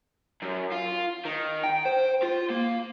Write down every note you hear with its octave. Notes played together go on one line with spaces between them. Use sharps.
F#2
F4
D#3
G5
C5
F4
A#3